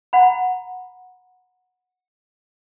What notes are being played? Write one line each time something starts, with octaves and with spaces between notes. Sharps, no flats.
F#5 A#5 B5